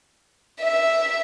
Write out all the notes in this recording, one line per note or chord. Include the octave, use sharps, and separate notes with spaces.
E5